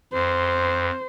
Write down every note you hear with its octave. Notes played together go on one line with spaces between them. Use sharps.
F2 C5